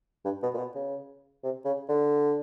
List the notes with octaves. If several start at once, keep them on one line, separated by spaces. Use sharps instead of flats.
G2
B2
A#2
B2
C#3
C3
C#3
D3